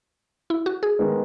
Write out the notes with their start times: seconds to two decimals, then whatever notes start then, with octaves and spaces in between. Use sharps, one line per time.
0.50 E4
0.66 F#4
0.83 G#4
0.99 D#3 G#3 B3